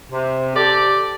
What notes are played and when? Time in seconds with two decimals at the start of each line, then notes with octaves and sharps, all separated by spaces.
0.11 C3
0.56 G4 A4 D5